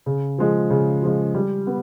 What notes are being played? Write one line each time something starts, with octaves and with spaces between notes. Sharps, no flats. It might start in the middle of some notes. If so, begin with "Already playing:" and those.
C#3
F3 G#3
C#3
F3 G#3
G3
B3